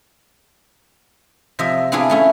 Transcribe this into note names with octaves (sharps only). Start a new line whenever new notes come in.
C3 F3 D#5 E5
B3 C4 D4 E4 F4 G#4
A3 C#4 E4